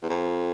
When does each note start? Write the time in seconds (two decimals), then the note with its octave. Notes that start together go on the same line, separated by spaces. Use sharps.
0.03 E2
0.10 F2